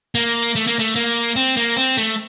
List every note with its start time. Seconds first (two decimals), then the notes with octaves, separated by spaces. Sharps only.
0.15 A#3
0.55 A3
0.67 A#3
0.79 A3
0.95 A#3
1.36 C4
1.57 A#3
1.77 C4
1.97 A3